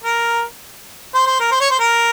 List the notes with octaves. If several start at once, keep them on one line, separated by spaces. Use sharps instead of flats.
A#4
C5
C5
A#4
C5
C#5
C5
A#4